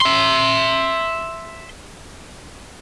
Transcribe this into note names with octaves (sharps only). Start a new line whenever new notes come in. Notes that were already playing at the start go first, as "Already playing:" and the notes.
E5 C6